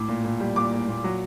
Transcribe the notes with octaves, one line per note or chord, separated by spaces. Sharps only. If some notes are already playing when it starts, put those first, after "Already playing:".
Already playing: A2 D6
A#2
A#2
G3
A#2 D6
A#2
A#2
F#3